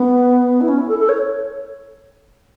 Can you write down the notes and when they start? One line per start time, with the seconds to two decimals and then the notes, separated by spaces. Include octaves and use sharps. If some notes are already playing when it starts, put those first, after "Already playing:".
Already playing: B3
0.61 E4
0.68 C#4
0.78 E4
0.88 A4
0.99 A4
1.09 C#5